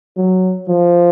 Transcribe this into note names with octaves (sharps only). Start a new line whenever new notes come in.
F#3
F3